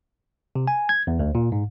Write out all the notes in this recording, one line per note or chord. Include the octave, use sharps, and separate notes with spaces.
C3
G#5
G#6
E2
D2
A#2
G#2